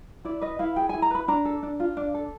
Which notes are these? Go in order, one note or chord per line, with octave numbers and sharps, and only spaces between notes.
E4 D5
B4 D#5
E4 F5
G#4 G5
E4 G#5
A#5
B4 B5
D4 A#5
A4
D4
F4
D4
A4